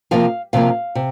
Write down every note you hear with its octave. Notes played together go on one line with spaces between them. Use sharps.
C3 F3 A#3 F5
C3 F3 A#3 F5
C3